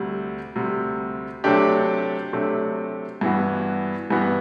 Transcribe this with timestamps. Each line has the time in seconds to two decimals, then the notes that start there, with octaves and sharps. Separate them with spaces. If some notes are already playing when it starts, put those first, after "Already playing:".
Already playing: D2 C3 G3
0.56 D2 C3 G3
1.44 C3 F#3 A3 D4 G4
2.33 C3 F#3 A3 D4 G4
3.21 G2 E3 B3 F#4
4.10 G2 E3 B3 F#4